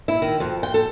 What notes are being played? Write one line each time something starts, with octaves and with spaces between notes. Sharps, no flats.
E4
D#3
F2
G5
A4